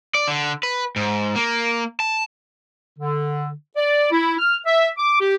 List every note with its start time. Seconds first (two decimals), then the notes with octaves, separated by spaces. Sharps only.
0.15 D5
0.28 D3
0.63 B4
0.96 G#2
1.36 A#3
2.00 A5
2.98 D3
3.76 D5
4.11 E4
4.39 F6
4.66 E5
4.97 D6
5.20 G4